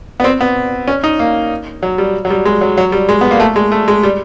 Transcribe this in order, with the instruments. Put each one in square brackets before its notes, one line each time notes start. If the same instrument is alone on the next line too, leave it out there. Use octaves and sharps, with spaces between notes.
[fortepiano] B3
C4
B3
C#4
D#4
A#3
F#3
G3
F#3
G3
G#3
F#3
F#3
G3
G#3
B3
A#3
A3
G#3
A3
G#3
G3